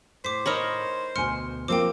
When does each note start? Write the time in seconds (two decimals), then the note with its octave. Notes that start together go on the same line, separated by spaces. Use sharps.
0.25 A2 C5 D6 B6
0.46 D#4 A#4 C#5 B5 D#6
1.16 D2 B2 G#5 C6 F6 C#7
1.68 F3 A#3 C4 G4 G5 D6